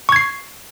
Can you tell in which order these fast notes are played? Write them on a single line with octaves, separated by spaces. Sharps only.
C#6 G#6 C7